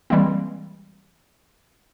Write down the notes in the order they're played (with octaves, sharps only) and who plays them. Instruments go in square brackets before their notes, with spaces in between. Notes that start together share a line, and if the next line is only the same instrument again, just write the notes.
[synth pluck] E3 G3 G#3 A#3 C4